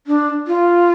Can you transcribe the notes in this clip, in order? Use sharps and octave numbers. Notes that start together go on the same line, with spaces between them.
D4
F4